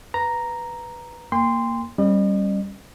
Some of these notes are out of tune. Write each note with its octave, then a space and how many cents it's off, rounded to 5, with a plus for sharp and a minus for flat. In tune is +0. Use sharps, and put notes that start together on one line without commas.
B4 +0 A#5 +0
A#3 -5 G5 +35 C6 -10
G3 +0 C#4 -30 D#5 -45